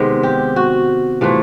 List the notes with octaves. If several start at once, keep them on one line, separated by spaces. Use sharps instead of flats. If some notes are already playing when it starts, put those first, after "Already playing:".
Already playing: C3 D#3 G#3 B3
G4
F#4
C3 E3 A3 F4